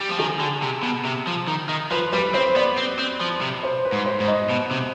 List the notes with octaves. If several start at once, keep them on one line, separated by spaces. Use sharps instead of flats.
G3
F3
D#3 G#4
D3
C3
B2
C3
F3
D#3
D#3
F3 B4
G3 B4
C4 C5
B3 D5
C4
C4
F3
C3
C5
B4
G#2
C5
G#2
D#5
B2
C3